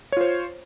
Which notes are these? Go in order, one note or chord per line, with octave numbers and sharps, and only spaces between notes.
F4 C5 C#5